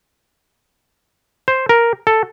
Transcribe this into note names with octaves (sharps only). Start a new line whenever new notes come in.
C5
A#4
A4